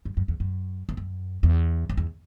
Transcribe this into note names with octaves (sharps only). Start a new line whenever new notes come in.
F#2
F#2
E2
F#2
E2
F#2
E2
F#2
E2